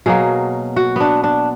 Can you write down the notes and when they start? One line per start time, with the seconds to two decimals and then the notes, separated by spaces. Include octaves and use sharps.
0.06 B2 F#3 A#3 G#4
0.76 F#4
0.96 B3 D4
1.24 D4